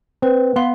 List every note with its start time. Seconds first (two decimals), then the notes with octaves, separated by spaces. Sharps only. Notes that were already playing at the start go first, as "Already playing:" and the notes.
0.22 C4 B4
0.56 B3 F5 C6